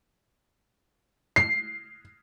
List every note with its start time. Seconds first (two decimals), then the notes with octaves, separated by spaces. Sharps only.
1.36 C7